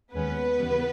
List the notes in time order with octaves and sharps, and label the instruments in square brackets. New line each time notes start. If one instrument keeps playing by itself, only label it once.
[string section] D#2 D#3 G#3 B3 C#4 B4
D#2 C#3 E3 G3